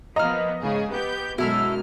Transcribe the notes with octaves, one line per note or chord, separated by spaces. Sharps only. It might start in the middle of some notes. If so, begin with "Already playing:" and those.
F3 A#3 B3 D#5 A#5 F6
G#2 C#3 G#4
B3 G4 G6
F#2 B2 G#3 E4 A4 E5 F6